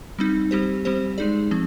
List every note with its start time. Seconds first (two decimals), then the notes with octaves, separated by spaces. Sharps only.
0.19 G3 C4 D#4
0.51 G3 C4 G4 C5
0.85 G3 C4 G4 C5
1.18 G#3 D#4 G#4 D5
1.51 F3 C4